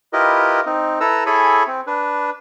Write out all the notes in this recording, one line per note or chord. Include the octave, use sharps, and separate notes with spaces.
E4 F4 G4 A#4 B4 D#5
C4 D#4
E4 A4 B4 A#5 E6
E4 G#4 A4 C#5 G#5 B5
C4
D4 B4